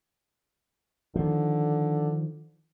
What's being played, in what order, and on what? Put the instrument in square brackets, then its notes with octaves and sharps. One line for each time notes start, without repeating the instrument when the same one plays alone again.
[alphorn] D3 [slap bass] D#3 F3